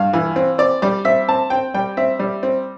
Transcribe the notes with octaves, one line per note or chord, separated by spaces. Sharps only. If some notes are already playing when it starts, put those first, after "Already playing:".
Already playing: G2 F5
E3
C4
C4 D5
G3 D5
C4 E5
C4 A5
C4 G5
G3 G5
C4 E5
G3
C4